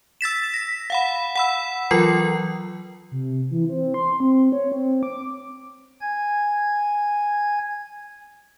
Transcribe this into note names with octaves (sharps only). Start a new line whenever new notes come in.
E6 A6 B6 E7
A#6 B6
F5 F#5 B5
F#5 B5 E6
E3 F#3 F4 A#4 C7
C3
E3
C4
C6
C4
C#5
C4
D6
G#5 G#6